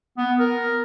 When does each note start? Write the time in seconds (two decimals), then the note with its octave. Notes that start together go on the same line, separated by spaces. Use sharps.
0.18 B3
0.39 A#4